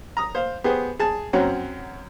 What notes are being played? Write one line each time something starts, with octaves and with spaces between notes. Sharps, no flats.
A#5 D#6
C5 F5
B3 G4 G#4 C5
G#4 A5
F#2 F#3 C4 C#4 F#5 A#5